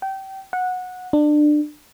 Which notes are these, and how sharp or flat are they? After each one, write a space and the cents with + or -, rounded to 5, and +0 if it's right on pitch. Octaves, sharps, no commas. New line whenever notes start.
G5 -25
F#5 -15
D4 +25